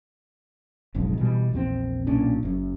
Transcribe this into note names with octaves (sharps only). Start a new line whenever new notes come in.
F#1 B1 F2 G#2
B2 E3 G3
A#1 E2 E3 C4
B1 A#2 C#4 D4
F#1 F#2